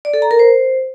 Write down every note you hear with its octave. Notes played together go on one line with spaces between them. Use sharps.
D5
A4
A#5
A#4
C5